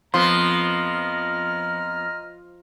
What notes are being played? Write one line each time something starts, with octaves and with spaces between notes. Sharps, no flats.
F2 F3 B3 C4 D#5 A#5 C6 F6